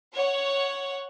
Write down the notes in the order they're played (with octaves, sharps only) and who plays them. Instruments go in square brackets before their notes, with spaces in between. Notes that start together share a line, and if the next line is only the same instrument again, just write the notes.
[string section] C#5 F#5